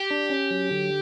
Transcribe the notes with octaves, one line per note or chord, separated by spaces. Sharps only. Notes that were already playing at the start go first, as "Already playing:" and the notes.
Already playing: G4
D4
C#4
F#3
D3